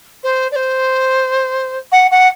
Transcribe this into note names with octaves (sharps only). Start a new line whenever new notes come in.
C5
D5
C5
F#5
F#5